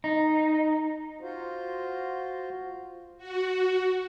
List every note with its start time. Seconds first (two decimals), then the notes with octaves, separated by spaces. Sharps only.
0.04 D#4
1.21 F4 F#4 C5
3.18 F#4